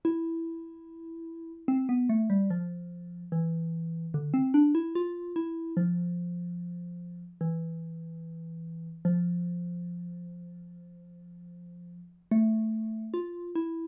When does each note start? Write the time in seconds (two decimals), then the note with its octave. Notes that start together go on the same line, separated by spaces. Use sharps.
0.05 E4
1.68 C4
1.89 B3
2.09 A3
2.30 G3
2.50 F3
3.32 E3
4.14 D3
4.34 C4
4.54 D4
4.75 E4
4.95 F4
5.36 E4
5.77 F3
7.41 E3
9.05 F3
12.31 A3
13.14 F4
13.55 E4